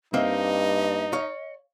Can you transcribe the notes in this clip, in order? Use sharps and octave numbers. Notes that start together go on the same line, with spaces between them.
G2 A#3 C4 D#4 D#5 E5
C#5 F5